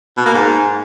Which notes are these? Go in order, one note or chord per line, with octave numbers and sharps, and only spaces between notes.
B2
A#3
G#2